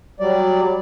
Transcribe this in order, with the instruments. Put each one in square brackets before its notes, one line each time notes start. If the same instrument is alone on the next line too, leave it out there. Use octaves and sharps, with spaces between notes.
[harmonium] F#3 G3 D5